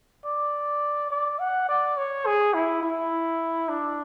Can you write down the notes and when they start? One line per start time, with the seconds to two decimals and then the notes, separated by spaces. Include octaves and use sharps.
0.25 D5
1.10 D5
1.39 F#5
1.68 D5
1.97 C#5
2.26 G#4
2.54 E4
2.83 E4
3.69 D4